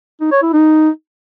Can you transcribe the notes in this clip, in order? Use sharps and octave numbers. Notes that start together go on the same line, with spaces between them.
D#4
C#5
E4
D#4